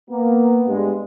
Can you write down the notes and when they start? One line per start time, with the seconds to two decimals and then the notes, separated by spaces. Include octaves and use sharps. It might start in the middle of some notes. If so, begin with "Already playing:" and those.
0.10 A#3 B3
0.67 G2 G#3